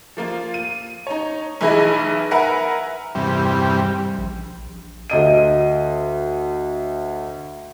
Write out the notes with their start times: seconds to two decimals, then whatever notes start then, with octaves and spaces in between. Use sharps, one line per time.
0.17 F3 A#3 F4
0.54 D#7
1.07 D#4 C#5
1.61 B1 E3 E4 G#4 D#5
2.31 A#4 B4 E5 F#5 G#5
3.15 E2 G2 C3 G3
4.18 A#1
5.10 D2 D#5 D#7